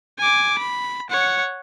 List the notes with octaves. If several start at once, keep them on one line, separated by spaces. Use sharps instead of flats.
G#5 D6
B5
C#5 F#5